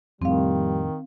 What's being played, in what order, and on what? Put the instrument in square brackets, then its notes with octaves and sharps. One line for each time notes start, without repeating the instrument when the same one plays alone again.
[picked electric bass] F2 A2 [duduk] D#3 [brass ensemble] G3 [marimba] C4 F5